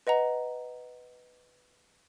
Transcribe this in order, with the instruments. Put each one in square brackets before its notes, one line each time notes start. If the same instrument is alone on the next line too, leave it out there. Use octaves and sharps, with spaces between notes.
[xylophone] B4 D#5 F#5 A#5